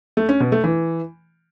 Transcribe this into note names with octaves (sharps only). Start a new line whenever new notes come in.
A3
C#4
B2
A3
E3